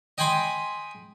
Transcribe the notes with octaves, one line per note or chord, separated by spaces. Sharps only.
D#5 G5 G#5 B5 C6 D6